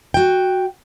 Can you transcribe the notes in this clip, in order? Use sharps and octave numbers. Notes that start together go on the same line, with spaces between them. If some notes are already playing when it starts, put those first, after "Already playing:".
F#4 G5